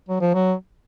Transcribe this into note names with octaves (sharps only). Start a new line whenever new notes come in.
F#3
F3
F#3